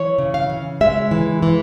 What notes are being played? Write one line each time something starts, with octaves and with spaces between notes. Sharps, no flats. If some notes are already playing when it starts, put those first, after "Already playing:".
Already playing: E3 C#5
C#3
F5
C#3
G#3 E5
E3
E3